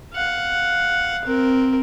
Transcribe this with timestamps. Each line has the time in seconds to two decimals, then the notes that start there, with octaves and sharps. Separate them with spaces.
0.14 F5 F#5
1.25 C4 A#4